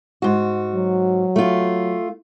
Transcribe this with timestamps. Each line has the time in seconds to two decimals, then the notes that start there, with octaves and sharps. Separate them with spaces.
0.22 G#2 F#4
0.75 F#3
1.36 A3 F4